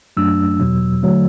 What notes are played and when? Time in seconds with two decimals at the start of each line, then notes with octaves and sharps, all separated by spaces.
0.17 F#2 F#3 A3 D4 E6
0.60 E2 B2 F#3
1.03 D3 F#3 A3